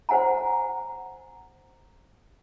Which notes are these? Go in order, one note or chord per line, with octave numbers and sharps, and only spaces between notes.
C5 F#5 G#5 A#5